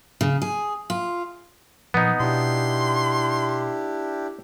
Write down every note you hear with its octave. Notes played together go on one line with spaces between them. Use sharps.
C#3
G#4
F4
A#2 F3 B3 D#4
B2 D4 E4 G4 C6